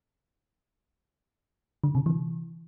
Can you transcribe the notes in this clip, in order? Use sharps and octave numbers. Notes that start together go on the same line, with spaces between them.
D3
C3
E3